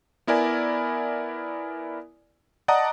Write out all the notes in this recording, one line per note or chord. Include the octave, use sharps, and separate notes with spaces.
B3 E4 A#4 D5 G#5
D5 D#5 F#5 A5 A#5 D#6